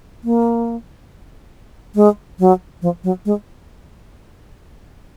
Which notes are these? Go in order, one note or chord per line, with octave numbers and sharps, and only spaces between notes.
A#3
G#3
F#3
F3
F#3
G#3